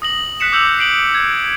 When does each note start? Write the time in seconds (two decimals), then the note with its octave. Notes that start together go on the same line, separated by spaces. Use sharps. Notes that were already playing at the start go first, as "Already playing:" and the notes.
0.02 D#6 A#6 F#7
0.40 F#6 B6 C#7 E7
0.52 D6 E6 G6 C#7 F7 F#7
0.79 C7 D7 F#7
1.15 G#6